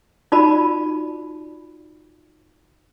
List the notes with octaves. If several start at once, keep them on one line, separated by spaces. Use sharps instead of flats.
D#4 F4 F#4 D5 A5 B5